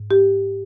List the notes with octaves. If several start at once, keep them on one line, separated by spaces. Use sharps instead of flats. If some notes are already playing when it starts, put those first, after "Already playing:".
Already playing: G#2
G4